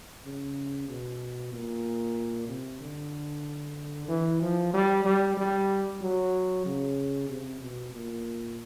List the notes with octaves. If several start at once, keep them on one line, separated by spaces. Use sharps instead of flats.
C#3
B2
A#2
C3
D3
E3
F3
G3
G3
G3
F#3
C#3
C3
B2
A#2